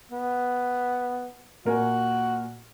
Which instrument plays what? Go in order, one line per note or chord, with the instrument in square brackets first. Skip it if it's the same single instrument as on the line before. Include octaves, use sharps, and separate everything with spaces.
[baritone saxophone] B3
[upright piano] A#2 A#4 G#5 [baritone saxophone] F#4